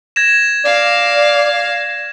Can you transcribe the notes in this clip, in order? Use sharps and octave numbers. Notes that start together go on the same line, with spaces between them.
G#6 A#6 E7
D5 F5